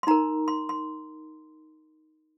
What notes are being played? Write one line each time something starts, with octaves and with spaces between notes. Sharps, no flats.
C6
D#4 A#4 A#5
C6
C6